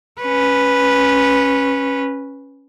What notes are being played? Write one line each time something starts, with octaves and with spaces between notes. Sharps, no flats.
C#4 B4